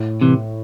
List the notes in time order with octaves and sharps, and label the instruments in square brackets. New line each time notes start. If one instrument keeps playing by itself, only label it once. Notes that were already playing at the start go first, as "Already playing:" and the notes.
Already playing: [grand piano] A2
[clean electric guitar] C3 E3